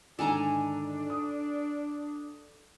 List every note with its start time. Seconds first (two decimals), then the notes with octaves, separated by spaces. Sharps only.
0.19 G#2 D3 D#3 D4 A4 G#5 A#5
1.10 D#6